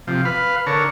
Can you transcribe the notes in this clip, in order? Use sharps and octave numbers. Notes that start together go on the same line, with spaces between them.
C3 F3
B4 F5
D3 A4 A#4 C#5